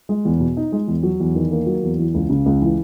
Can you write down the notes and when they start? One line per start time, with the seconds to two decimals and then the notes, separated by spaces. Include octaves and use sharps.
0.09 G#3
0.25 E2
0.40 B2
0.57 D#4
0.72 G#3
0.88 E2
1.03 F#3
1.20 E2
1.35 D#3
1.51 A#3
1.67 F#3
1.83 E2
1.99 E3
2.14 C#2
2.30 C#3
2.46 C#2
2.62 E3